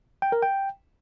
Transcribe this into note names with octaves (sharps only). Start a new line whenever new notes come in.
G5
A#4
G5